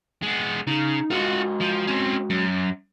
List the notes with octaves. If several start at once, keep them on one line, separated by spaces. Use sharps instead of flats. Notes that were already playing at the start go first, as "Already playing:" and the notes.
G#3 B3
C#3 D#4
G#3 F4 F#4 A#4 F#5
F3
C4 C#4
F#2